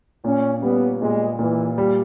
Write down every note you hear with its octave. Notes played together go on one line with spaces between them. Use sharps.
A#2 C#4
G3 B3
A#2 G#3
A#2 E3
G3